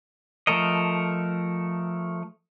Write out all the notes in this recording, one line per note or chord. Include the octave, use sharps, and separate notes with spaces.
F3 A3 A4 A#4 D#5